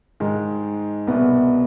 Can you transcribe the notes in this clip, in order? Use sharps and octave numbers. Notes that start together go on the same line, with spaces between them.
G#2 D#3 G#3
C2 B2 B3